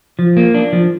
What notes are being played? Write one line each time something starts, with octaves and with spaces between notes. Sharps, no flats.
F3
A#3
D4
F3